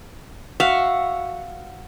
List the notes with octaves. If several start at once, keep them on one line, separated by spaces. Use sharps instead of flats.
F#4 E5 F5